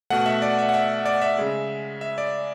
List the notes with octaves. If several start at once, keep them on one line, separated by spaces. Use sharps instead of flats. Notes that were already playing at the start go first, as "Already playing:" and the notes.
B2 A3 F#5
E5
D5
E5
F#5
E5
D5
E5
C#3 G#3
E5
D5